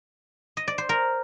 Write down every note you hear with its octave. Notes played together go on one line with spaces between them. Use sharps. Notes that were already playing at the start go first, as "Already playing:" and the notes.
D#5
D5
C5
A#4